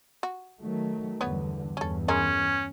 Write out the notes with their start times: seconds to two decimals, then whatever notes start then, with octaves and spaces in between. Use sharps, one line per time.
0.23 F#4
0.60 D#3 F#3 A3
1.21 E2 G2 D3 B3 B4 C#5
1.77 E2 G2 C#4 A4
2.08 G#3 C#4 G#4 A#4